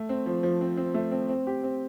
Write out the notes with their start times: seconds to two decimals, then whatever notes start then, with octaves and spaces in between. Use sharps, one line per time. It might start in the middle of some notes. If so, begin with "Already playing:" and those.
Already playing: A3
0.09 C4
0.26 F3
0.43 F3
0.61 C4
0.77 C4
0.94 A3
1.11 C4
1.29 C4
1.47 G4
1.63 C4